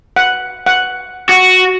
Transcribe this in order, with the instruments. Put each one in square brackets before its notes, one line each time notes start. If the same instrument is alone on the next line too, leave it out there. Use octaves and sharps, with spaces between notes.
[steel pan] F#5
F#5
[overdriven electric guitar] F#4